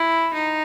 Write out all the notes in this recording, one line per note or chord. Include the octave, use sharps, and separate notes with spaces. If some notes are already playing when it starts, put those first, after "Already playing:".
Already playing: E4
D#4